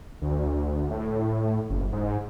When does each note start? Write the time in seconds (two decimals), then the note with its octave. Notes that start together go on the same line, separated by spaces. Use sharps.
0.22 D2
0.91 A2
1.70 F#1
1.92 G#2